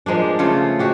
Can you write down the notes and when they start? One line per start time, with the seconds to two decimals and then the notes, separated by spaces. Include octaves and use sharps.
0.06 F3 G#3 A#3 D4
0.39 C#3 A3 F4
0.79 G#3 F#4 G4